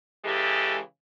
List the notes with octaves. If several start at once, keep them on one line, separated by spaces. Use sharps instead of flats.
C#3 E3 G#3 G4 A4